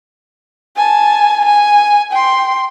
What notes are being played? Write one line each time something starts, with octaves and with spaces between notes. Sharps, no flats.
G#5 A5
G#5
G5 C6